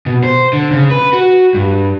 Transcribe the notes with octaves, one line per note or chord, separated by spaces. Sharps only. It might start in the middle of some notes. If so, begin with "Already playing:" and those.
B2
C5
D3
C#3
B4
F#4
G2